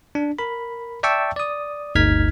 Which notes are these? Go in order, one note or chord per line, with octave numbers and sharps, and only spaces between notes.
D4
A#4 B5
D5 E5 G5 A5 C#6 E6
D5 D#6
G1 D2 D#4 F6 G#6 B6